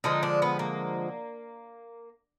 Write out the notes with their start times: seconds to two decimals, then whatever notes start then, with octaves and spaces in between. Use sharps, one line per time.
0.04 D3 F3 G#3 D#4
0.23 D4
0.42 B3
0.59 A#3